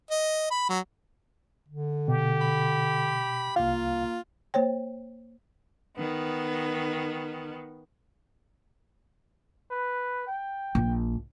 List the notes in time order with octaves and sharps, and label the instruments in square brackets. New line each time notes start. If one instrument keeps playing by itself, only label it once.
[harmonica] D#5
B5
F#3
[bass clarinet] D3
[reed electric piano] B2 [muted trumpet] G4
[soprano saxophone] B5
[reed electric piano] C2 F5 [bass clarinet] A#3 [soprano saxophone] F4
[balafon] A#3 C5 C#5 G5
[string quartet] D#3 B3
[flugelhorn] B4
G5
[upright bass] A#1